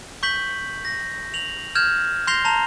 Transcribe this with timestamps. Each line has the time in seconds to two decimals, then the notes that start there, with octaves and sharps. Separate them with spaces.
0.23 C#6 G6 B6 F#7
0.85 A#6
1.34 F7 F#7
1.75 F6 G6 G#6 E7
2.27 C6 G6 A#6 C7 F7 G7
2.45 A5 A#5 C6 F7